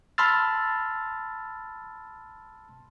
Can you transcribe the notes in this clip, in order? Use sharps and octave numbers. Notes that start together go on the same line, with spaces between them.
A5 B5 C6 E6 F6 A6